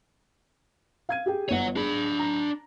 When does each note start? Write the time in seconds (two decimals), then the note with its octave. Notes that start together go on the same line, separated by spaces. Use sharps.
1.09 F5 G#6 D#7
1.26 G4 G#4 G5
1.49 G1 C#5 F#5 D#7
1.76 D4 G#4 B5
2.19 A#5